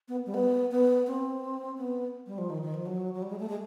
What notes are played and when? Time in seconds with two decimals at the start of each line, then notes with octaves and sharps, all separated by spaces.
0.08 B3
0.26 G3
0.34 B3
0.71 B3
1.07 C4
1.78 B3
2.27 G3
2.38 F3
2.50 D#3
2.63 D#3
2.74 F3
2.86 F#3
3.14 F#3
3.22 G3
3.30 G#3
3.39 A3
3.49 G#3